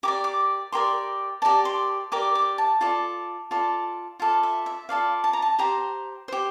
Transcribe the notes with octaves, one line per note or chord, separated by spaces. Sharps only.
G4 A#4 D5 D6
D6
G4 A#4 D5 C6
G4 A#4 D5 A5
C6
G4 A#4 D5 D6
D6
A5
F4 A4 D5
F4 A4 D5
F4 A4 D5 F5
E5
E5
F4 A4 D5 F5
A5
A#5
A5
G4 C5 A#5
G4 C5